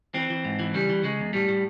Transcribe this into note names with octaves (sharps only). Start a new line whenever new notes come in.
E3 C4
E3
G#2
E3
C#3 G3
E3
C#3 G#3
E2
A2 G3
A2